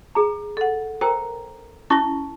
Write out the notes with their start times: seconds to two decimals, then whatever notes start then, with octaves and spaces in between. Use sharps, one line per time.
0.15 G#4 A#5
0.57 A4 F#5
1.01 A#4 C5 G5 A#5
1.90 C#4 E4 A5 C#6 A#6